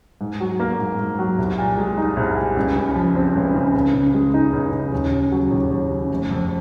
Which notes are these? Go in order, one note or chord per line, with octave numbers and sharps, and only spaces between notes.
G#2
F#3
A#3
G#2
G#2
F#3
C2
A#2
G#3
D#4
C2
A#2
C#2
C#3
F3
C4
C#2
C#3
C#2
C#3
G#3
D#4
C#2
C#3
D#2
C#3
F#3
D#2
D#2
C#3
F1
F2